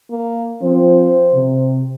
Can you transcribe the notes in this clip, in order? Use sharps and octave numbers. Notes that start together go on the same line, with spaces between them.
A#3
F3 C4 C5
C3